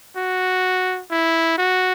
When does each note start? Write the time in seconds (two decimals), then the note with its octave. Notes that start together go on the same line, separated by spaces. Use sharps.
0.16 F#4
1.11 E4
1.58 F#4